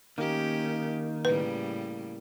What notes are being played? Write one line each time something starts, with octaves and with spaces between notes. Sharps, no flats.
D#3 A#3 C#4 G4
A2 C#3 G3 B4